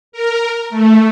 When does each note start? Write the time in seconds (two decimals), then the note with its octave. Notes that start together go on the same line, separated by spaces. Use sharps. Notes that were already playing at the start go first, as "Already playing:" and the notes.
0.12 A#4
0.70 A3